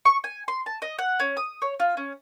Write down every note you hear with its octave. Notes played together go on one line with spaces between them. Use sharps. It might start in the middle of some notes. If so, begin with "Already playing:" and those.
C#6
G#5
C6
A5
D#5
F#5
C#4
D#6
C#5
F4
C#4